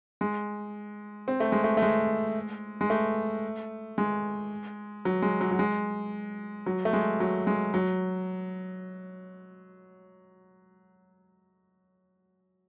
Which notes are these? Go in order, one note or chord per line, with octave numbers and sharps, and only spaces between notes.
G#3
C4
A3
G#3
A3
A3
G#3
G#3
A3
G#3
F#3
G#3
F#3
F#3
G#3
F#3
A3
G#3
F#3
G#3
F#3